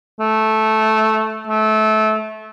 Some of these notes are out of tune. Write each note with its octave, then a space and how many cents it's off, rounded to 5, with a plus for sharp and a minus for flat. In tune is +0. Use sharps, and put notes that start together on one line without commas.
A3 -10
A3 -25